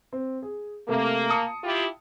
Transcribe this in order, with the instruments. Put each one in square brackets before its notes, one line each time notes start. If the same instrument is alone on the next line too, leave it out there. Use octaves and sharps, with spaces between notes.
[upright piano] C4
G#4
[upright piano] C3 A3 [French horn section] A#3
[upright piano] A5 D#6 C#7
[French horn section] E4 F4 G4